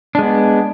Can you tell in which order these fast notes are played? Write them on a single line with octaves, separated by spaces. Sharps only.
D4 G#3 B3